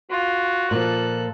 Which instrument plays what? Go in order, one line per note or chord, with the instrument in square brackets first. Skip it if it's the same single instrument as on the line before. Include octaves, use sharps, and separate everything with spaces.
[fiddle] F4 [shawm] F#4
[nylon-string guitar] A#2 F3 [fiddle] A4 F#6